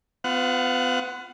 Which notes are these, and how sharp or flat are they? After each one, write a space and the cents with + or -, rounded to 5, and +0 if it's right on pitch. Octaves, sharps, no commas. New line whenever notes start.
B3 +40 F4 +0 F#5 +0